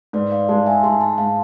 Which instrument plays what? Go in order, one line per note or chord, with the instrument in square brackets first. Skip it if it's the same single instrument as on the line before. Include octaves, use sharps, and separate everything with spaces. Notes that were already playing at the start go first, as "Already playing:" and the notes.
[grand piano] G#2 [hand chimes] B4 D5
[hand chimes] D5 F5
[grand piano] G#3 [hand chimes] F5 A5
[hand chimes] E5 G#5
[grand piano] G#3 [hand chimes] A5 C6
[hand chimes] A5 C6
[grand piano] G#2 [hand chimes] F5 A5